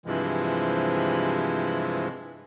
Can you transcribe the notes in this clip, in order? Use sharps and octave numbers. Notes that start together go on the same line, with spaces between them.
G2 C3 E3 F3 G#3